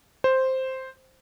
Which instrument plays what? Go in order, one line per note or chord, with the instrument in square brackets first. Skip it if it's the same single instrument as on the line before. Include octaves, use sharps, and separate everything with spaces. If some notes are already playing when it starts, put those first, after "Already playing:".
[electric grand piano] C5